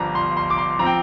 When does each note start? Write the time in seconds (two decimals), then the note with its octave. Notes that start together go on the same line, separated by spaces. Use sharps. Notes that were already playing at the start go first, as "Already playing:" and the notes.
Already playing: G1 G2 F3 A#5
0.15 C6
0.37 C6
0.50 D6
0.58 C6
0.79 F3 C4 A#5
0.86 G5